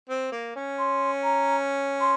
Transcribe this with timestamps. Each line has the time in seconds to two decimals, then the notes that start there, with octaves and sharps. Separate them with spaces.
0.09 C4
0.32 A#3
0.56 C#4
0.79 C6
1.24 A#5
2.01 C6